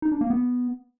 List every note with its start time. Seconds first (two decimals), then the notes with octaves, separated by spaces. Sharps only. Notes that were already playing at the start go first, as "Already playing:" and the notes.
0.02 D#4
0.12 D4
0.21 A#3
0.30 B3